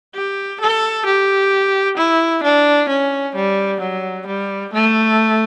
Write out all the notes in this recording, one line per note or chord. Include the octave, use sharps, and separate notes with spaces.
G4
A4
G4
E4
D4
C#4
G3
F#3
G3
A3